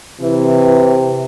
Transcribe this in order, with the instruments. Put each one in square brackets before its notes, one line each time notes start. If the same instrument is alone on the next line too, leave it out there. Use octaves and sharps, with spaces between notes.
[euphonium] C3 [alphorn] E3